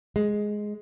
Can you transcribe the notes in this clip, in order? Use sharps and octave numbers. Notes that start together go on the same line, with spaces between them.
G#3